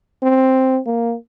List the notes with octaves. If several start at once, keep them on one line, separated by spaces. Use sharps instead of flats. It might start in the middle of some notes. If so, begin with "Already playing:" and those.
C4
A#3